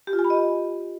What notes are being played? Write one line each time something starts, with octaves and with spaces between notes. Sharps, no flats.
G4
F4
G#5
B5
D#5